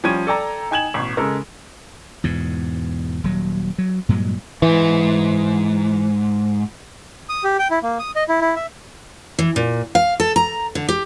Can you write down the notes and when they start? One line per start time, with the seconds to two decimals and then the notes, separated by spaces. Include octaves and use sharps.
0.04 F3 G3 C#4 G#6 D#7
0.27 A4 D5 G5 A#5
0.71 D#4 G5 G#5 G#6 E7 F#7
0.94 A1 B2
1.17 C#3 G#3 A4 A#4
2.24 E2 G#2 B2
3.24 D#1 F#3
3.78 F#3
4.09 G2 A#2 F#3 G#3
4.62 G#2 E3
7.29 D#6
7.44 G4
7.59 G5
7.71 E4
7.83 A#3
7.99 D#6
8.16 D#5
8.29 E4
8.41 E4
8.56 E5
9.39 E3
9.56 A#2
9.95 F5
10.20 A4
10.36 A#5
10.75 D3
10.88 G4